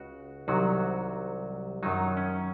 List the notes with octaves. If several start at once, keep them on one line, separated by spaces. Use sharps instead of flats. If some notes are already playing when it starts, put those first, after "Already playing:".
Already playing: C#2 C#3 F#4
C2 C3 D#3 F#3 F#4
F#2 D#3 F#3 D#4
C#4